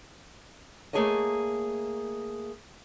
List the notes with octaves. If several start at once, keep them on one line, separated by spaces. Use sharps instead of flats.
A3 A#3 G#4 A4 C#5 D#5